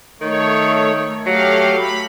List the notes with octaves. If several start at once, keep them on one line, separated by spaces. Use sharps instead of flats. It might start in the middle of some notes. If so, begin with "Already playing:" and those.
D#3 A3 C#5
F#3 A3 G4 F5
B5